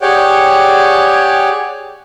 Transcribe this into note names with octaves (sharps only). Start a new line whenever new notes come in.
G4 G#4 C#5 D5 F#5 G5